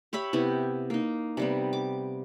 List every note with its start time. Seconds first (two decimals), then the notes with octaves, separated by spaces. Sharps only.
0.13 G4 C#5 E5 B5
0.33 C3 B3 E4 G4
0.90 A#3 D#4
1.37 C3 G3 B3
1.73 D6